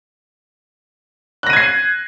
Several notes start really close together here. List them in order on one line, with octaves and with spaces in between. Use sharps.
F#6 A#6 D#7 G#6 C7